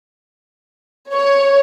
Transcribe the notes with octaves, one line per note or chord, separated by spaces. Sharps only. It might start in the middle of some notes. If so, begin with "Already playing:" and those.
C#5